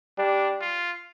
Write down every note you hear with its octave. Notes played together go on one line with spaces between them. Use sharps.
G3 D4
F4